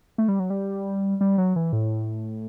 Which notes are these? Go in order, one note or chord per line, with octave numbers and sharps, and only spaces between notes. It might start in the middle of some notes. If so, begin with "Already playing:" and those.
A3
G3
F#3
G3
G3
F#3
E3
A2